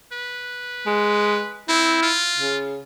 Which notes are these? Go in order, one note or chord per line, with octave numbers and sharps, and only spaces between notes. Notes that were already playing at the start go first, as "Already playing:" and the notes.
B4
G#3
C4 E4
F4
C#3